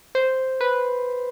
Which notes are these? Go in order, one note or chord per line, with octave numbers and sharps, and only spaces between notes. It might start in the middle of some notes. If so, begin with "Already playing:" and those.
C5
B4